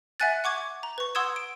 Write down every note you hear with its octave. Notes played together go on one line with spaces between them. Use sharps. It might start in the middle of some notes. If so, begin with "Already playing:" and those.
E5 F#5 G#5 F#6 A6
F#5 C#6 D6 G#6
A#5
B4 C#6
F#5 C6 D#6 E6 G#6 E7
D7